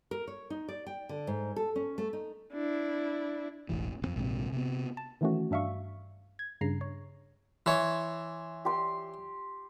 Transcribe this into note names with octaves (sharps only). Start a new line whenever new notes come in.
A#4
C#5
D#4
D5
G5
D3
G#2
A4
C#4
A3
D#4
D4 E4
E1 A1 E3
A1 F2
A#1 G#2 C3
C3 B3
A5
D#3 E3 A3 C#4 F#4
G2 D4 E5 F5 C#6
G#6
G2 C#3 A#5 C7
C#5
E3 C#5 C6
G4 C6